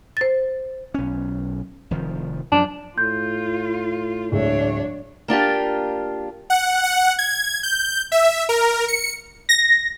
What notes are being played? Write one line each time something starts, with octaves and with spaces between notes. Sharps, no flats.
C5 A6
B1 C#4
F1 D#3 F3
F#2 F3 D4
A2 F4 C6 G6
D1 G#3 D4 C#5 E5
A#3 D4 F4 G4
F#5
F#5
G#6
G6
E5
A#4
C#7
A#6